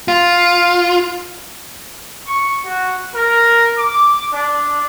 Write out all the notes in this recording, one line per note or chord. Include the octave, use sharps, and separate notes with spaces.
F4
C#6
F#4
A#4
D6
D4